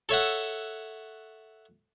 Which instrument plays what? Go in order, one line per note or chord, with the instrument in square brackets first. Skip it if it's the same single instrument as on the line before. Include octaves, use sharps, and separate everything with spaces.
[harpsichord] A4 C#5 E5 F#5